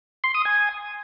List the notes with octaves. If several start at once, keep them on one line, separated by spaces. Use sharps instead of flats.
C6
D#6
G#5